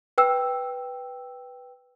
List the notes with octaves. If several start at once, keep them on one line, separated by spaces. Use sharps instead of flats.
B4 G5 E6